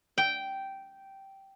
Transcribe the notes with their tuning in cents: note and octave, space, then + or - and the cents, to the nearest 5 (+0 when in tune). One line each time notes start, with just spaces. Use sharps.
G5 -10